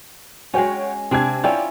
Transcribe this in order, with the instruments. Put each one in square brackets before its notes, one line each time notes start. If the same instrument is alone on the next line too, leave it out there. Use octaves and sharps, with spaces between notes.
[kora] G#3 C#4 [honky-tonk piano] F#4 C#5 G5
[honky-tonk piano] C3 G#5 G#6 [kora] C4 D4
[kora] C#4 E4 F4 [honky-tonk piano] D5 G5